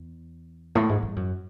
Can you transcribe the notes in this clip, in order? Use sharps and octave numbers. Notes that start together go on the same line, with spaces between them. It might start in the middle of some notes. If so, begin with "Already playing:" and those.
Already playing: E2
A2
G#2
G2
F#2